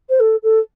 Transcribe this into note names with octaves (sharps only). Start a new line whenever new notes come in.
C5
A4
A4